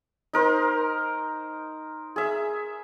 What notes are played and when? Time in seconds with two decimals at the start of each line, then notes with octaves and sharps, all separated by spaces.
0.33 D#4 A#4 C5
2.16 G#4 E5